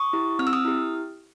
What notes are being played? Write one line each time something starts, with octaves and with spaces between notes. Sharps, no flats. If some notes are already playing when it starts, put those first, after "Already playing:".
Already playing: C#6 D#6
E4 G4
C4 F6
E6
D#6 F6
E4 G4